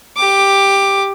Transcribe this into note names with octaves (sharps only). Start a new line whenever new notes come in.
G4 D6